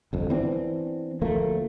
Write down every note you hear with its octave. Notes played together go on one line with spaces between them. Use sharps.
G1 F2
E3 B3 C4 D4
D2 F3 A3 A#3